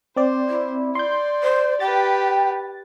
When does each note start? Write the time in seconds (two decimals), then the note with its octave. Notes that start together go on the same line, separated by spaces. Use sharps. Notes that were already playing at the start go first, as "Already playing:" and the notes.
0.16 C4 C5 D5
0.49 E4
0.95 D5 C6 G6
1.43 C5
1.80 G4 B4 G5 A6